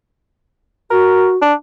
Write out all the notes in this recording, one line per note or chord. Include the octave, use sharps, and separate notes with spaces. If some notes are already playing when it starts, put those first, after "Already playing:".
F#4 A#4
D4